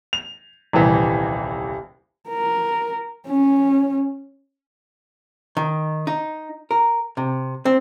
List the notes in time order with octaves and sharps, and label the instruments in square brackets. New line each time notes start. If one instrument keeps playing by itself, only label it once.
[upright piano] F7
D#1 C2 E3 B6
[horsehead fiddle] A#4
C#4
[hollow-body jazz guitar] D#3
D#4
A#4
C3
C4